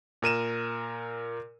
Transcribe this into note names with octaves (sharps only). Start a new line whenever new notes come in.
A#2 A#4 D#7 E7